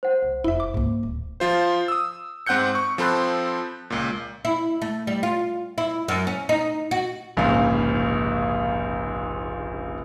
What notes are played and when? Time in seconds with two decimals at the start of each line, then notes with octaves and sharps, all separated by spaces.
0.03 C5 F#5
0.22 C2
0.44 F1 E2 E4 E5
0.60 D6
0.74 C#2 G#2 A#3
1.03 D1
1.40 F3 F4 C5
1.88 D#6 E6
2.46 G#2 C4 F#5 F#6 G6 C#7
2.75 C#6
2.98 F3 C4 A4 B5 C6 F#6
3.90 C#2 A#2
4.45 E4
4.82 A3
5.07 G3
5.23 F4
5.78 E4
6.08 F#2
6.27 C#4
6.49 D#4
6.91 F#4
7.37 F1 A#1 G#2 C#3 F5